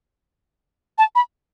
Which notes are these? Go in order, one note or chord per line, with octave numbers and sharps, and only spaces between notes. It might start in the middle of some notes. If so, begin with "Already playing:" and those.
A5
B5